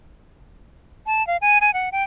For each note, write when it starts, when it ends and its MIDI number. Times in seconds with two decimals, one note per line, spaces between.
1.06 1.25 81
1.27 1.37 77
1.41 1.58 80
1.61 1.73 80
1.74 1.89 78
1.92 2.04 79